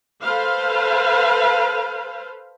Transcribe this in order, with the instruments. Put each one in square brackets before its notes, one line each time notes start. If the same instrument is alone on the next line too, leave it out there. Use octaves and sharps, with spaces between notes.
[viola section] A4 B4 C5 F5